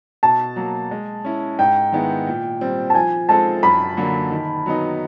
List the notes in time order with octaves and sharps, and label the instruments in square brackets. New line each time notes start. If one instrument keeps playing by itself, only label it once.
[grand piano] B2 [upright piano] A5
[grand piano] F#3 A#3
G#3
C#4 E4
[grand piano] G#2 [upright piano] G5
[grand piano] D#3 G#3 B3 E4
A#2
G3 C4
[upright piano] A5
[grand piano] F3 [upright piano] G#5
[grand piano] G#3 C4 F4 A4 [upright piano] A5
[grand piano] F#2 [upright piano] B5
[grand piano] D3 F#3 A#3
D#3
F#3 B3 D#4